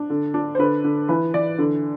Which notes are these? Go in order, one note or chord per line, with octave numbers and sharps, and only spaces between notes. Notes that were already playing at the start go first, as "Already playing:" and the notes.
Already playing: D4
D3
D4
C5
D3 B4
D3
E3 B4
E3 D5
D3